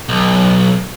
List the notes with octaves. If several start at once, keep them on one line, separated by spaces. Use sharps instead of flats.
B1